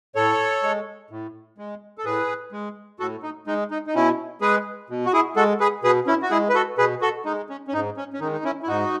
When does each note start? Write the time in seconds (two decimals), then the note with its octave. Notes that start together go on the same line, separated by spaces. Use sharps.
0.15 A2 A4 C#5
0.63 G#3
1.10 A2
1.58 G#3
1.98 A4
2.04 A2 G#4 B4
2.52 G#3
3.00 A2 F#4 A4
3.23 D#4
3.47 G#3 D#4
3.71 D#4
3.87 D#4
3.95 B2 C#4 E4
4.41 G#3 G#4 B4
4.90 B2
5.06 F#4
5.13 E4 G#4
5.36 G#3 F#4 A4
5.60 G#4 B4
5.83 B2 G#4 B4
6.07 C#4 E4
6.22 F#4
6.30 G#3 E4 G#4
6.49 B4
6.55 F#4 A4
6.78 B2 G#4 B4
7.01 F#4 A4
7.25 G#3 D#4
7.50 C#4
7.68 C#4
7.73 G#2 D#4
7.97 C#4
8.13 C#4
8.20 D#3 D#4
8.24 G#3
8.33 D#4
8.44 C#4 E4
8.63 E4
8.67 G#2 D#4 F#4